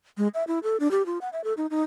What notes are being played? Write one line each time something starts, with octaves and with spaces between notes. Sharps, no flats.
G#3
E5
E4
A4
D4
G4
F4
F#5
E5
A4
D#4
D#4